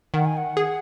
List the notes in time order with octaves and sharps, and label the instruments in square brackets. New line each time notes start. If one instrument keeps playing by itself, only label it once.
[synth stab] D#3 [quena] F#5
[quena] G#5
F#5
[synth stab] G#4